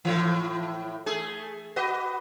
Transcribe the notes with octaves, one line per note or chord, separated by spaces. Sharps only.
A2 E3
A3 G#4
F#4 B4 D#5